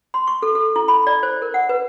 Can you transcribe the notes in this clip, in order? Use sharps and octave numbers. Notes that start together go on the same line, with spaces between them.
C6
C#6
A4
A4
E4
B5
D5
C5
A#4
F#5
B4